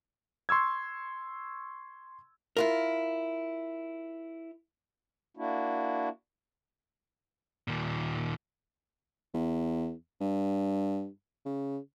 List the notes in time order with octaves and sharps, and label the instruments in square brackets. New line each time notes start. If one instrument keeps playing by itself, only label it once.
[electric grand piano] C6 C#6 E6 G#6
[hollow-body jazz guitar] E4 F4 A#4
[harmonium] A#3 D4 E4 F#4
[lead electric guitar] D#2 A#2
[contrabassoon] E2
G2
C#3